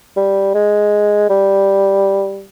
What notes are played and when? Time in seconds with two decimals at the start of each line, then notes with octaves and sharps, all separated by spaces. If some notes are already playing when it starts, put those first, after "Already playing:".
0.16 G3
0.54 G#3
1.29 G3